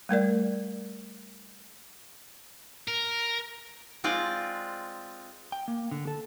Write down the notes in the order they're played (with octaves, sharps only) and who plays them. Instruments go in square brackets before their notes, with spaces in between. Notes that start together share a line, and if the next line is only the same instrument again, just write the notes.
[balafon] G3 A3 A#4 D5
[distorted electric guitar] A#4
[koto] G#3 C4 F4 D5
[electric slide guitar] G5
A#3
D3
A4